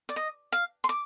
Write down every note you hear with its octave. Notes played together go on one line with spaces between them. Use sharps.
D5
D#5
F5
C6
D6